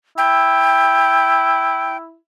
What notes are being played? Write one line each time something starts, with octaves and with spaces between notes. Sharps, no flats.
E4 G5